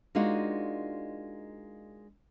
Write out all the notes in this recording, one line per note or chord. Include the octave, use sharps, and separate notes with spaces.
G#3 A#3 D4 D#4 F4 F#4